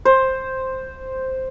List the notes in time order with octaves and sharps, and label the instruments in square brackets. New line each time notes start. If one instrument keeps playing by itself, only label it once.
[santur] C5